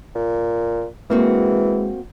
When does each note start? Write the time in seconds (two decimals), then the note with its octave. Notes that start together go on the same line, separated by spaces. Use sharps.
0.15 A#2
1.10 E3 G#3 A#3 C4 F#4